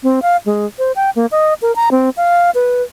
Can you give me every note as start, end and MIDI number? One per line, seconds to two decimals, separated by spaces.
0.03 0.20 60
0.22 0.37 77
0.46 0.66 56
0.79 0.92 72
0.96 1.10 79
1.16 1.26 58
1.32 1.54 75
1.62 1.74 70
1.76 1.89 82
1.91 2.10 60
2.17 2.50 77
2.55 2.83 71